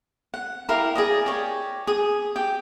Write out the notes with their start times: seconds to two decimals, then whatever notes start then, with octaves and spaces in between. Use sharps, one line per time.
0.34 F#5
0.69 E4 G4 A#4 F5
0.95 G#4 D5 D#5
1.26 G4 C#5
1.87 G#4 D#6
2.36 G4 G5